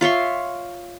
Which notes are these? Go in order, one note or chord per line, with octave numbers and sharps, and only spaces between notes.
F4 C#5 E5 C6